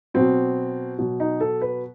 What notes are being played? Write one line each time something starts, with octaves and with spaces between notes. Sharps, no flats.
B2 F#3 C4
B2 F#3
D#4
A4
B4